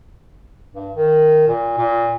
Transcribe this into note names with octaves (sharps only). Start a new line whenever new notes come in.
G2
D#3
A#2
A#2